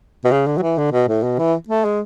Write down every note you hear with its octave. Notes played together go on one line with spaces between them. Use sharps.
B2
C#3
D3
F#3
E3
D3
B2
A2
B2
E3
A3
G#3